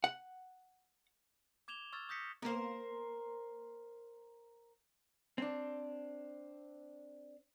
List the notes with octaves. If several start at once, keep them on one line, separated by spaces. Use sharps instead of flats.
F#5
D6 G#6 E7 F7 G7
C#6 E6 F6 G#6 A6
D#6 G6 A#6 B6 C#7
A#3 B3 A#4 C5
C4 D4